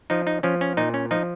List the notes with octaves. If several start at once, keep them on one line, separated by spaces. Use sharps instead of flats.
F3 D#4
D#4
F3 C#4
C#4
A#2 D#4
C#4
F3 D#4